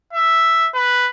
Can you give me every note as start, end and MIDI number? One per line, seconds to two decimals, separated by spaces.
0.13 0.68 76
0.75 1.09 71